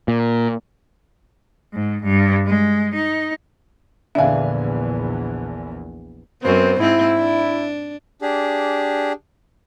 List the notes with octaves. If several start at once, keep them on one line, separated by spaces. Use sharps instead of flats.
A#2
G#2
G2
G#3
D#4
A#1 E2 D3 D4 E5 F5 G#5
F#2 B3 C4 C5
G#2 C4 E4
D4
D4 G4 G#4